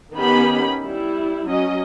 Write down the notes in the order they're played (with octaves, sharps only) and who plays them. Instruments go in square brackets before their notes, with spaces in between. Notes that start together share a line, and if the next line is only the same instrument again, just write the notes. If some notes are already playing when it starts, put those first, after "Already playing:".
[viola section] D#3 B3 C#4 D#4 G4 B5
G3 E4
F#3 C#4 D#5